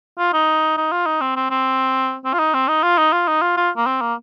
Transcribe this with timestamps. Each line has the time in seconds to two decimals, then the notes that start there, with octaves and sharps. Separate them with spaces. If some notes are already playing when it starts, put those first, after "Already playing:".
0.18 F4
0.33 D#4
0.77 D#4
0.92 F4
1.06 D#4
1.21 C4
1.36 C4
1.51 C4
2.25 C4
2.33 F4
2.39 D#4
2.54 C4
2.68 D#4
2.83 F4
2.98 D#4
3.13 F4
3.28 D#4
3.42 F4
3.57 F4
3.77 A#3
3.86 C4
4.01 A#3